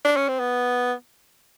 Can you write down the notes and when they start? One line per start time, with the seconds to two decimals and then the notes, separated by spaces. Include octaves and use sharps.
0.05 D4
0.16 C#4
0.28 C4
0.40 B3